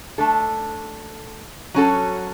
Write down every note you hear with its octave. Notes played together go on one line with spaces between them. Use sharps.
A3 D4 A4
F#3 C#4 F#4 A4